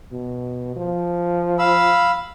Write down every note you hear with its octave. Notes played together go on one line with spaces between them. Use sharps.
B2
F3
F5 B5 E6